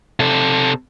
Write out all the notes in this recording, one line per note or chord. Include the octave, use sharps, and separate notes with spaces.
C3 A4